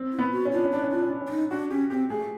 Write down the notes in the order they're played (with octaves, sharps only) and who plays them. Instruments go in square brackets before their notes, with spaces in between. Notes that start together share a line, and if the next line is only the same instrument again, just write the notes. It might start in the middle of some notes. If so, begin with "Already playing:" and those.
Already playing: [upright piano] C4
[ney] E4
[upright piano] B3
[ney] F#4
[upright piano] C#4
[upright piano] D4 [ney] F4
[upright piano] C#4
[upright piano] D4 [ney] E4
[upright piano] C#4
[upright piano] D4 [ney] F4
[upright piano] C#4
D4
C#4
[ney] D4
D#4
[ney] D4 [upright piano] F#4
[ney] C#4 [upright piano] G4
[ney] C4 [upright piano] G4
[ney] A3 [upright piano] G#4